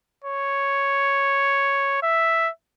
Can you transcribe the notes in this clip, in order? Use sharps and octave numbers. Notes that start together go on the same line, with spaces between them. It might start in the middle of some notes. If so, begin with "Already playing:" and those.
C#5
E5